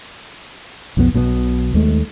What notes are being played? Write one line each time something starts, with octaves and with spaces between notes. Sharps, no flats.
B1 F2 D#3 B3
B1 B2 D#3 B3
D#2 G#3 A3